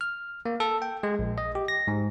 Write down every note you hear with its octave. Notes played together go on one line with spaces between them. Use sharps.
F6
A#3
A4
G5
G#3
A#1
D#5
G4
A#6
G#2